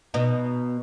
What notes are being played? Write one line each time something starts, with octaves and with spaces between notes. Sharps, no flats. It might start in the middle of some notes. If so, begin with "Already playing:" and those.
B2 D#4